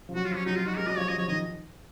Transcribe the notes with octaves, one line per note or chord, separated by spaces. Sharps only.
F3
F#3 F#4
F4
F3 C#4
F#3 D#4
F#3 F4
D#4 F#4
G#3 A#4
F#3 D#5
F3 C#5
F3 D#5
F3 C#5
D#3 D#5